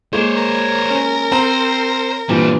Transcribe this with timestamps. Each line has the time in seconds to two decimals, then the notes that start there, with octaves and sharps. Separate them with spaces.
0.13 G#3 A#3 C5 C#5
0.37 A#4
0.90 C#4
1.32 C4 C5 A#5
2.29 G2 A#2 E3 G3 C4